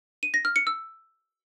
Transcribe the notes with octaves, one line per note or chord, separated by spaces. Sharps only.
D#7
A#6
F6
C#7
E6